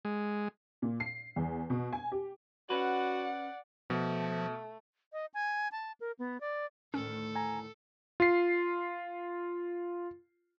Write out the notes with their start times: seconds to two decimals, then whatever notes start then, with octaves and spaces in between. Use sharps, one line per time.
0.05 G#3
0.82 A#2
1.00 C7
1.36 E2
1.70 B2
1.93 G#5
2.12 G4
2.70 C#4 F#4 B4 D5 F#5
3.90 B2 F3 A3
5.13 D#5
5.34 G#5
5.72 A5
6.00 A#4
6.19 B3
6.41 D5
6.94 D2 A2 D#3 C#4 A4
7.35 G#5 A#5
8.20 F4 C7